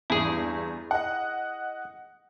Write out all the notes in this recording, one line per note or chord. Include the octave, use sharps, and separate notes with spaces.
E2 G2 E4 G#4
D#5 F#5